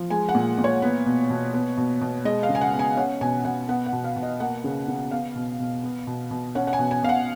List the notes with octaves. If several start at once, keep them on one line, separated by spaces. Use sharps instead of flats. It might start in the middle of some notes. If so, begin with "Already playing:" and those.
Already playing: F3
G#3 G#5
F#5
A#2
A#2
C#5
B3
B2
B2
B3
B2
B2
G#3 D#5
F5
C#3
G#5
F#5
B3
G#5
C#4 F#5
B2 G#5
B2 F#5
B3 F#5
F#5
B2
F5
B2
D#5
A#3 F#5
C#3
C#3
B3 F5
B2
B2
B3
B2
B2
C#4 F#5
F#5
G#5
B2
G#5
B2 F5
F#5